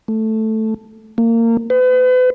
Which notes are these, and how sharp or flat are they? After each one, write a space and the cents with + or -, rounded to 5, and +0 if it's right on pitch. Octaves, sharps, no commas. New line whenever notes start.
A3 +0
A#3 -25
B4 +40